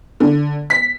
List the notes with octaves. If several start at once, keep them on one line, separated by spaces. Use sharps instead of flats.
D3
B6